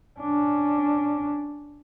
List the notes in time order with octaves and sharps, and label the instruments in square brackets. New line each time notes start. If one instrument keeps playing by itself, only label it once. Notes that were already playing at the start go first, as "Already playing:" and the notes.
[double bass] C#4 D4